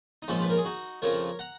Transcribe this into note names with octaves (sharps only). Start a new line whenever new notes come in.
D#4
A#1 G#2 F3 C#4 F4
B4
A#4
G#4
D#4 F#4
F2 C#3 F3 A#4 C#5
F#5 A#5